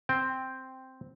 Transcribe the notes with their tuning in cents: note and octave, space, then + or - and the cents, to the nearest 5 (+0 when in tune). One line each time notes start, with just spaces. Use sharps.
C4 +0 G5 +5